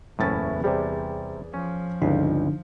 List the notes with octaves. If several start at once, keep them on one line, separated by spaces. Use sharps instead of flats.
F#1 E2 A2 C#4 E4 A6
C3 G3 G#4 C5 D5
F3 C#4
G1 C#2 D3 D4 D#4